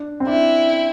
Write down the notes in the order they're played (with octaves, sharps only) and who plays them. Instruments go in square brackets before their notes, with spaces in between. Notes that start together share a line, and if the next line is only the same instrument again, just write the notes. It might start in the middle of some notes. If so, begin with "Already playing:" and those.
Already playing: [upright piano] D4
C4
[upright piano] D4 [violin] E4